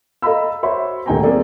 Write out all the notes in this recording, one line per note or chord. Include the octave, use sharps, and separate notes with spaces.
A4 D#5 F5 A#5 B5 E6
F#4 C5 C#5 E5 B5 C6
D#1 D2 A#3 G5 G#5 A#5
F#3 A#3 C4 G#4 A4 D5